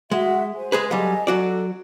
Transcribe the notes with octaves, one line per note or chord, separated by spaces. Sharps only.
G#3 F#4 E5 F#5
C5 G#5
G#3 G#4 B4
F#3 G3 A4 D#5 G#5
F#3 F#4 A4 D5